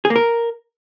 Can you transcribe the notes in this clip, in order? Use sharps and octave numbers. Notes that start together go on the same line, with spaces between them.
G#4
A#3
A#4